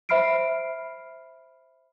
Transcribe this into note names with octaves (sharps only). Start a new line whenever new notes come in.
C5 E5 B5 F6 C7 D7